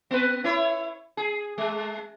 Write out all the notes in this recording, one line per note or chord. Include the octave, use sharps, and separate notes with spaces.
B3 B4
E4 C#5
G#4
G#3